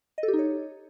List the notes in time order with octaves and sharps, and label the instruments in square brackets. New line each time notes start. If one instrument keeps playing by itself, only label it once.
[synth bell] D#5
A4
G4
D#4
C#5